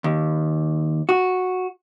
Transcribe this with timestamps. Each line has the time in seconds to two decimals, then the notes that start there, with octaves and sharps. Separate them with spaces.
0.04 D#2
1.09 F#4